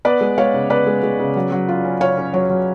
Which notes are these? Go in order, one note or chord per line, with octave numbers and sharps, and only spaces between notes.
B3 B4 D5
G#3
G#3 C#5 F5
C#3
B3 B4 D5
G#3
G#3
C#3
F#3
F#3
F4
C#4
F4 C#5 F5
C#4
F#3 C#5
F#3